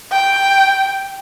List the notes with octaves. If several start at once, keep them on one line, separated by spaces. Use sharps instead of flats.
G5